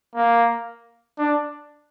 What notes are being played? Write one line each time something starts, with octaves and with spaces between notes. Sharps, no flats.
A#3
D4